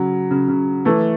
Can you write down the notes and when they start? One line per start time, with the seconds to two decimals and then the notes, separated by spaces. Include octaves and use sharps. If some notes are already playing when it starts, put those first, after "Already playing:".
Already playing: C#3 F#3
0.31 C#3
0.48 C#3
0.85 E3 A3